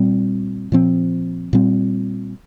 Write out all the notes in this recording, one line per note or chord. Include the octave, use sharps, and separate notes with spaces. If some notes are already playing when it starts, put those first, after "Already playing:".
Already playing: A#2 G3 C4
A#2 F3 C4
A#2 G3 C4